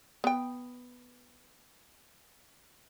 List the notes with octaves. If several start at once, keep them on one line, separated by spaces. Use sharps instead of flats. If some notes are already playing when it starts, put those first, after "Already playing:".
B3 G5